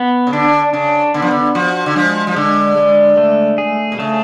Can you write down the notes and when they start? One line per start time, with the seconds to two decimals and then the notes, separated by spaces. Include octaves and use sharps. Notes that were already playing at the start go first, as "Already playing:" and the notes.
Already playing: B3
0.27 C#3
0.33 D3 D4
0.73 C#3 D4
1.14 D3 B3
1.22 F3
1.31 D3
1.55 F3 F#4
1.86 D3
1.96 F3 G#3
2.27 F3
2.36 D3 G#3
2.77 G#3
3.17 A3
3.58 G#4
3.92 B2
3.99 C#3 A3